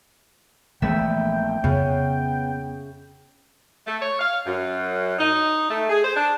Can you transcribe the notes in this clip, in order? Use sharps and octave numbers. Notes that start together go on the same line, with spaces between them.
A#1 E3 G#3 A3 B3 E5 G5
F2 C#3 B3
A3
C#5
F5
F#2
D#4
A3
G#4
C5
D4